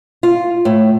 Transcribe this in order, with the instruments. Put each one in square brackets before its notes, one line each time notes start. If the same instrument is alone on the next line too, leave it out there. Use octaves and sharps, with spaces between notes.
[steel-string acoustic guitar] F4
A2